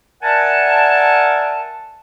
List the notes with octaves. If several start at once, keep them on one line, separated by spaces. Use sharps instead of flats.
A#4 D5 E5 F#5 G#5 A5